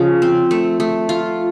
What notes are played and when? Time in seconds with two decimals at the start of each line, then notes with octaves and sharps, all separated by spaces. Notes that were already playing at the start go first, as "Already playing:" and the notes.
Already playing: C#3 F3
0.22 C4
0.51 A3
0.80 A3
1.09 F4